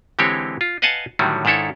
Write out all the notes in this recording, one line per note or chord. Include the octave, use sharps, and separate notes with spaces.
D3 E3 G#3 C4 G4 C#5
F4
B4 D#5 F5 F#5 G#5 A5
A2 D3 D#3 F#3 G3
G#2 D#3 D4 E4 A4 C#5